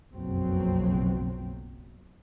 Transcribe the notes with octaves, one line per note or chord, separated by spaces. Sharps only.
F#1 B1 F2 B2 F#3 C4